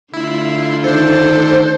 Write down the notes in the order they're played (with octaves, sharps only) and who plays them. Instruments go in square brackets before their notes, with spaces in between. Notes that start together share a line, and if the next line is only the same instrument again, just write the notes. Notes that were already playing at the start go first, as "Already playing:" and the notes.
[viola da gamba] D3 A3 F4 [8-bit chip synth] E4
[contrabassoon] D#3 [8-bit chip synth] D4 A4 [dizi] C5